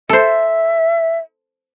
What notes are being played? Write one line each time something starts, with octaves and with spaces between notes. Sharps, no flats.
A4 C5 E5